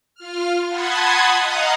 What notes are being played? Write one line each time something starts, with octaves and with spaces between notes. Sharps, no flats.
F4 F6
F#5 A5 B5 C6 D#6 G#6
D#5 F5 F#5 A#5 D#6